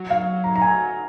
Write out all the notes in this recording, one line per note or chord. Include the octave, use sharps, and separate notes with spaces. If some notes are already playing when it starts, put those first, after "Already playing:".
Already playing: F#3
F5
A#5
A#5
G#5